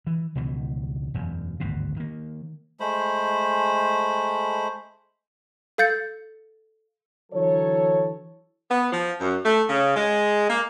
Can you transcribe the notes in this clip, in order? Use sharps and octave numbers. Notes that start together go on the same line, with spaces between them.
E3
C#2 B2 D#3 E3
E1 F#2
G#1 D2 G2 B2
D#3 A#3
G#3 A3 C5 B5
A4 F5 G6 A6 C#7
D3 E3 F#3 A4 C#5
B3
F3
F#2
A3
C#3
G#3
A#3